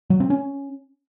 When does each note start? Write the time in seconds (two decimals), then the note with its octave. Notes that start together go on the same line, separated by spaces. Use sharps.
0.10 F#3
0.20 C4
0.30 C#4